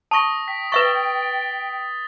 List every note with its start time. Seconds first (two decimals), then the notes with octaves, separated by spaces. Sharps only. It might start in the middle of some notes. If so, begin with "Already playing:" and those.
0.11 A5 C#6 D#6 A#6
0.48 G5 B6
0.72 B4 E5 C#6 A6 G7